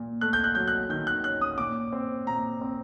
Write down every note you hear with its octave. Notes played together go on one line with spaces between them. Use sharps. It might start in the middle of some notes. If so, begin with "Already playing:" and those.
Already playing: A#2
A3 F#6
G6
F#6
F#3 G6
F#6
D#3 G6
F#6
C#4 F#6
D#6
A#2 D6
C4
A#2 A#5
C4